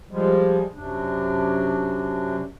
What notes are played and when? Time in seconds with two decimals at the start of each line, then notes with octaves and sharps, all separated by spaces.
0.11 F3 G3 G#3
0.75 F#2 C3 D4